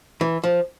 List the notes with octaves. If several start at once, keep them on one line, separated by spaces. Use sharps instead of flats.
E3
F3